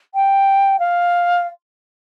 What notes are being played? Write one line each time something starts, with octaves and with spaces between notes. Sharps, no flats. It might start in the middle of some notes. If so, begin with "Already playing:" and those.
G5
F5